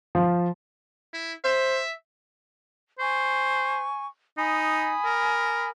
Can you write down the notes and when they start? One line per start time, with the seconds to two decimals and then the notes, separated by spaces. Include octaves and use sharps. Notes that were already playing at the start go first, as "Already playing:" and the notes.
0.15 F3
1.13 E4
1.44 C5 E5
2.99 C5 G#5 C#6
4.38 D#4 G#5 B5 D#6
5.05 A#4